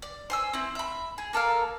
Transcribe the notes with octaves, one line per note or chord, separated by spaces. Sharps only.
D5
C5 G#5 E6
C4 E4
E5 B5
G#4
A#3 A4 A#4 F5